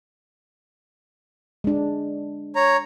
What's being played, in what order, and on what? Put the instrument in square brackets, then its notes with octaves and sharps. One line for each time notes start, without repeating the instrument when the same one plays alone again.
[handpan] G#3 D4
[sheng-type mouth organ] C#5 A#5